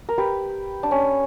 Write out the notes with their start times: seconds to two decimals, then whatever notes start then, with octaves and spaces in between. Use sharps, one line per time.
0.09 A#4
0.18 G4 B4
0.83 D4
0.91 C#4